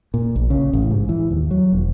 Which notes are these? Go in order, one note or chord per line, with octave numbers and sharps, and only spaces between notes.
A#2
A#1
C#3
A1
G#2
E3
D#2
F#3
E1